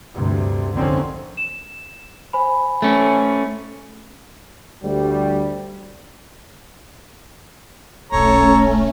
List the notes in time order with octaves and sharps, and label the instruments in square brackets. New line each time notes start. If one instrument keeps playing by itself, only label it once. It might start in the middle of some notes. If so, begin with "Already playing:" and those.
[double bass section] D2 G2 C3
A#1 F2 D3 D#3 C4 C#4
[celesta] E7
C5 G#5 B5
[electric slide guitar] A3 C#4
[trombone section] D2 G3
[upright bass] D#1 B1 [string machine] A3 C#4 [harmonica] A4 C#5 A#5